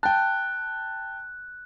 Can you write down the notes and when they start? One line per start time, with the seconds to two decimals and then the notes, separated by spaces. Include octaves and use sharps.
0.03 G5 A5 F#6